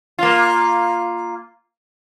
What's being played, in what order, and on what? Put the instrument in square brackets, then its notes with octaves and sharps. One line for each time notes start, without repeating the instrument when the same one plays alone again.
[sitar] A#3 F4